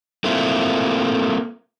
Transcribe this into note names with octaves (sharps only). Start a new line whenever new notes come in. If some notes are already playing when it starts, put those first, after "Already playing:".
A3 A#3 C4 E4 F4